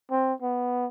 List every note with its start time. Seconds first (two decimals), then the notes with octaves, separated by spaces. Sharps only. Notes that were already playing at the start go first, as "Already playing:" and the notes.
0.11 C4
0.42 B3